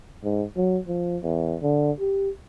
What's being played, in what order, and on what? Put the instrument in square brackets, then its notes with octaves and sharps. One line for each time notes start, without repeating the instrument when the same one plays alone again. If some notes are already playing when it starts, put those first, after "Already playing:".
[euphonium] G#2
F#3
F3
E2
D3
G4